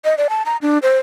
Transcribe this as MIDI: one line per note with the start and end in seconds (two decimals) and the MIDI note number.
0.05 0.15 75
0.18 0.27 74
0.30 0.42 81
0.46 0.57 82
0.62 0.78 62
0.82 0.98 72